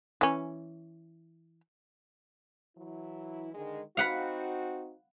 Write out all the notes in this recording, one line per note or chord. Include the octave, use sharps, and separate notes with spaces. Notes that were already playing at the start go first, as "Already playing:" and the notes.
E3 C#4
E3 F#3 E4
D3 D#3 G#3
C4 D#4 F#4 F5 F#5 B5